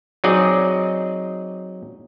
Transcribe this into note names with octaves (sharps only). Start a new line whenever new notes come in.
F#3 C4 D#4 G#4 D5 D#5